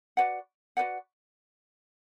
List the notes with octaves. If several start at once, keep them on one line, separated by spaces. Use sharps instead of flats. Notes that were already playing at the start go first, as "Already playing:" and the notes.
F#4 B4 D5 F#5
F#4 B4 D5 F#5